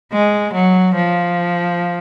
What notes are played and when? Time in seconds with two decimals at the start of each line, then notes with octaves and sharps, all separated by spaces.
0.13 G#3
0.53 F#3
0.95 F3